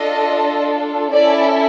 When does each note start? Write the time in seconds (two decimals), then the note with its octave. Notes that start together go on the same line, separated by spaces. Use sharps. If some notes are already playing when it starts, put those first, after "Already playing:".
Already playing: D4 F4 A4 D#5
1.12 C#4 E4 A4 D5